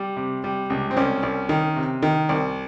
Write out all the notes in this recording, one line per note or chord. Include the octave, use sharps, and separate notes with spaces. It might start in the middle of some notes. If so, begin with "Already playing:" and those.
Already playing: G3
C3
G3
C#2
C4
C2 C#4
C2
D#3
C3
D#3
C2